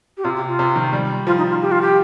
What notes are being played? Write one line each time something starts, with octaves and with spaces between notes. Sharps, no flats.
G4
C3 F4
G4
F4
C3
D#3
G3
F3 F4
D#4
F4
G4
F4
G4